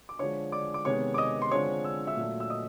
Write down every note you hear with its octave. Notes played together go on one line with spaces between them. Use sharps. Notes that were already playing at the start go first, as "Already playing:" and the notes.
D6
D3 F3 G#3 C#5 C#6
D5 D6
D6
C3 D#3 G#3 B3 C#5 C#6
D6
D#5 D#6
C6
D3 F3 G#3 C4 C#5 C#6
E6
E5 E6
A#2 F#3 A3
E6
D#5 D#6